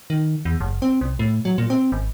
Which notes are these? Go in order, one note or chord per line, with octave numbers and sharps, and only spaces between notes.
D#3
E2
F#1
C4
C2
A2
F#3
A#2
C4
G#1